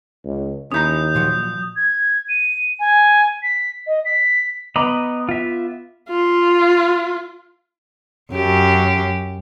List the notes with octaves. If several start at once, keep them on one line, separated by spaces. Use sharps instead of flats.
C#2
D#2 C#4 E4 A#5 D#6 G6
A#2 F3 F#3
G#6
D#7
G#5
B6
D#5
B6
B3 D#5 A#5 B5 D6
F4 E5
F4
F#2 G4